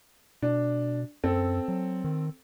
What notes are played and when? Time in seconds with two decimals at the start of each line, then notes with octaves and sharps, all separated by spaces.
0.42 B2 D4
1.24 F#2 C4 A4
1.68 F#3
2.04 D#3